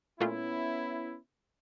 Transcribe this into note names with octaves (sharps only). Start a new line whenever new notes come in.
A#2 A3 B3 C#4 E4 F4